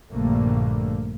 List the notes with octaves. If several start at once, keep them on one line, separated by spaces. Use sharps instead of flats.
A#1 G2 D3 A3 A#3